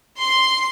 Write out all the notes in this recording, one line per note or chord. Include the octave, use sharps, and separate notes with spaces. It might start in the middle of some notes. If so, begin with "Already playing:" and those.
C6